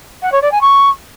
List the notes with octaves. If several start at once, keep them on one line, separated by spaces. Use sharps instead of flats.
F#5
C#5
D5
G#5
C#6